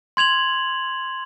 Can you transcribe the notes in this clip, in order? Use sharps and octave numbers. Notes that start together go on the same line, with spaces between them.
C6 G#6 F7 F#7